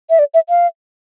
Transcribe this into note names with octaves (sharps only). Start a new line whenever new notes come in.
E5
D5
E5
F5